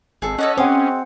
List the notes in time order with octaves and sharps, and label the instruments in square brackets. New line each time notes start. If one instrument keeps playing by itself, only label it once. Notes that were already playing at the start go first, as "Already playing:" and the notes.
[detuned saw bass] G#1 [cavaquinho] G#4 A4
[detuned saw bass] C#4 [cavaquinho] A4 D5 F#5 [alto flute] D#5
[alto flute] C4 [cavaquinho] G#4 D#5 D6 [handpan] C5 F#5